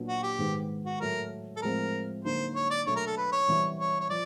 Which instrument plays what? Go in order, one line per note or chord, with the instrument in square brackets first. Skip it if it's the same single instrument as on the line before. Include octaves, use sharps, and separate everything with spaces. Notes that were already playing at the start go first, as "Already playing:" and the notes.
Already playing: [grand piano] A#2 F#3 B3 D4
[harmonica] F#4
G4
[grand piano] G#2 D#3 G#3 B3
[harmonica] F#4
[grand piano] A2 F#3 A3 [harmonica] A#4
[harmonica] A4
[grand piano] A2 F3 G#3 C4 F4 [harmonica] A#4
[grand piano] D3 F#3 A#3 D#4 [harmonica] C5
[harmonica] C#5
D5
[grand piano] B2 F#3 A3 D4 [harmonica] C#5
[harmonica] A#4
A4
B4
C#5
[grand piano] C3 E3 G3 B3
[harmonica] C#5
C#5
[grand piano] F3 [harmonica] D5